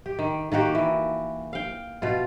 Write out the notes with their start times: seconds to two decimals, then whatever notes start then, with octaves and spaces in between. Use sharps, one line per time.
0.06 G4
0.19 D#3
0.52 D#3 A#3 F#4 G4
0.75 E3
1.53 F5 G5
2.02 B2 F4